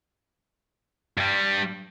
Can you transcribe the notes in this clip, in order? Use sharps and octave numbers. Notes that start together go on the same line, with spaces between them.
G2 G3